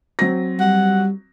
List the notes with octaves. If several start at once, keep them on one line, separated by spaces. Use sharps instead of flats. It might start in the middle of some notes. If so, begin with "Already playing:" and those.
F#3 C4 A#6
G3 F#5